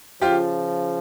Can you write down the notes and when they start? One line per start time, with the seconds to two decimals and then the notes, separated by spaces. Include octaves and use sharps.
0.22 C#3 F3 F4 G4